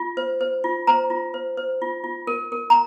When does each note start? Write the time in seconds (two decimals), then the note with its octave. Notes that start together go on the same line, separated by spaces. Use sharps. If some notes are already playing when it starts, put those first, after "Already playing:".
Already playing: F4
0.17 C5
0.41 C5
0.64 F4
0.87 C5 A#5
1.10 F4
1.34 C5
1.57 C5
1.82 F4
2.04 F4
2.27 A#4
2.52 A#4
2.70 A#5